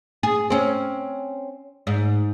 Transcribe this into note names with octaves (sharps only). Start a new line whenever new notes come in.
G#4
C4 C#4
G#2